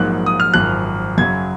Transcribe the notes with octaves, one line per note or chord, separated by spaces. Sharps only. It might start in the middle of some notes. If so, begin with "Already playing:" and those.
Already playing: A#1 G#2 F#3 A#3 F#6
D#6
F6
G#1 F#2 F3 F#6
F#2 C#3 F#3 G#6